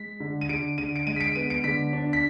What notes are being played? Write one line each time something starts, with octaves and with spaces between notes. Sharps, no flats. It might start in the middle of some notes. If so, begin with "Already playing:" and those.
Already playing: G#3 B6
D3
D#7
D3 D7
D3 D#7
D7
G#3 D#7
B6
D7
B3 D#7
D7
D3 B6
D4
B6